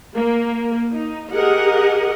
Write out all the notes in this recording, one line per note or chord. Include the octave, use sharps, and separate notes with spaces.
A#3
D#4
G4 G#4 A#4 D#5 F#5